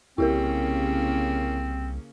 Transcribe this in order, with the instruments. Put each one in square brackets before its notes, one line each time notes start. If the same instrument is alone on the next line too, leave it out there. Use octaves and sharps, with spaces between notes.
[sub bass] C2 [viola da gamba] C#3 A#3 C#4 [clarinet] C4 [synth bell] E4 G4 A#4